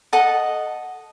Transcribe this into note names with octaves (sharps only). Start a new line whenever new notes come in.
A4 D#5 F#5 A5